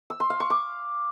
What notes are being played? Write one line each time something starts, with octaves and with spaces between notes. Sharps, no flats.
E6
C6
F5
C#6
D6